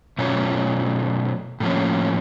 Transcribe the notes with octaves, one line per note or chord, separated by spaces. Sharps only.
B2 F#3 A3 C#4 F4
A2 F3 A#3 C#4